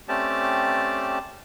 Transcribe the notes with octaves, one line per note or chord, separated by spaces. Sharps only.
A3 C4 C#4 G4 D5 A5